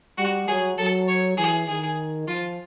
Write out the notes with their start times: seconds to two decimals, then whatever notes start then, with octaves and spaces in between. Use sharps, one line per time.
0.18 G3 F#4
0.48 F#3 G#4
0.78 F#3 A4
1.08 C#5
1.37 E3 G#4
1.67 D#3 G#4
2.27 F3 F4